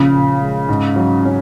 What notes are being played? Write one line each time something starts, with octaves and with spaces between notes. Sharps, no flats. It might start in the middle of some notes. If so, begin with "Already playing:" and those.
Already playing: A#1 C#3
A#2
G#3
G#2
F#3
C#4